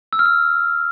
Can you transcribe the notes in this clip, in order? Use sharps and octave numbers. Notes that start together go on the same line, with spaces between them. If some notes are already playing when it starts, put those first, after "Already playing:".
E6
F6
E6